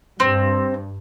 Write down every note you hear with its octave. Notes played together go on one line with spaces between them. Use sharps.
G2 C4